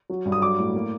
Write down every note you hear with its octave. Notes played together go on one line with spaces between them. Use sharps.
F#3
G2
D#6
F#3 D6
A2
A#3